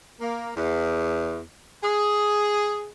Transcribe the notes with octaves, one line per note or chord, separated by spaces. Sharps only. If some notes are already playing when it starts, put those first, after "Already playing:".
A#3
E2
G#4